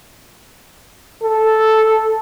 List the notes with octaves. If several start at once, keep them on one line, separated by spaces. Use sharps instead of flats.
A4